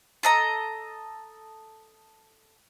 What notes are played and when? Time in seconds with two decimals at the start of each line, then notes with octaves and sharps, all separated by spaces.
0.23 A4 D#5 A#5